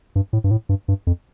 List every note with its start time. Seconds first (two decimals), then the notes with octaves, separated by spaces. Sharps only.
0.16 G2
0.33 A2
0.44 G2
0.51 A2
0.69 G2
0.88 G2
1.07 F2